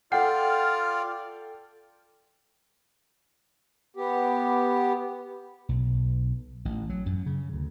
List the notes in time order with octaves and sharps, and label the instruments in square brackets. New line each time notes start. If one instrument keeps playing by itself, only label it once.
[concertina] F4 D5 [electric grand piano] A4 G5 [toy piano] F#5 [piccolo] F6
[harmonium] B3 G4
[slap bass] B1
A1
F#3
F#2
C#3
D2